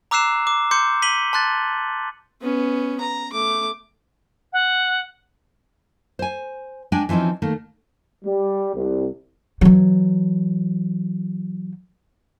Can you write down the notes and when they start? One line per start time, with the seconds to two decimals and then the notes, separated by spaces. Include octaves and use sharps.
0.11 A#5 D6 E6 F#6 C7 E7
0.47 D6
0.71 C6 D6 G6 C#7
1.02 B6 D#7 F#7 G7
1.33 A5 C6 F#6 A6
2.41 B3 C#4
3.00 A#5
3.31 A3 D6
4.52 F#5
6.19 C5 G#5
6.92 G#3 D4 G5 G#5
7.09 E3 F3 C4 C#4 D#4
7.42 D#3 A3 A#3
8.25 G3
8.75 C2
9.61 E3 F#3